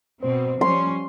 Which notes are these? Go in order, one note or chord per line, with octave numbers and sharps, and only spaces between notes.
B2 C4 C5
F3 G3 C#4 C6